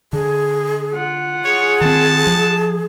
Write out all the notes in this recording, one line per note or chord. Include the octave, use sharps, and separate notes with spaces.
D3 G#4
F4 F#5
G#4 C#5
D#3 C4 A5
F3